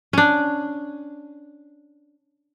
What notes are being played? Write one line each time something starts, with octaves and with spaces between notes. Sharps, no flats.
C#4 D4